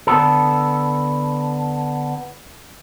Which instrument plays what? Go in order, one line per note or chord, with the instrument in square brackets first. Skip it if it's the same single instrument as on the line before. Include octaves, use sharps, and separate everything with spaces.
[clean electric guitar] D3 B3 A4